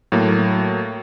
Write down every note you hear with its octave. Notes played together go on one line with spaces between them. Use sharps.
A2 F#3 A#3